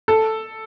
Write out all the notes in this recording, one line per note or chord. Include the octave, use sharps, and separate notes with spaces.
A4